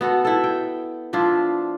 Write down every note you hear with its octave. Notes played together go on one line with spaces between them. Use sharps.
B3 F#4 A4
E4 A4
G5
F3 D4 E4 F4